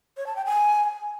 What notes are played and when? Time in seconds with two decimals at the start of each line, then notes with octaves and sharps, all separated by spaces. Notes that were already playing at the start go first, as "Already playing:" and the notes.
0.17 C#5
0.27 A5
0.36 G5
0.45 G#5